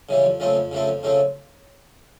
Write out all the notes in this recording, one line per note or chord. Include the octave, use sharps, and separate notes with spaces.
C#3 E3 G3
F2
C#3 F3 A3 C4
F2
C#3 F3 A3 C4
F2
C#3 F3 A3 C4